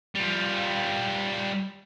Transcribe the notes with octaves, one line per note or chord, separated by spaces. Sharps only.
G3 F4